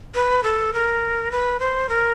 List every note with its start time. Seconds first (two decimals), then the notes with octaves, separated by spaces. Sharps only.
0.15 B4
0.43 A4
0.74 A#4
1.32 B4
1.60 C5
1.89 A#4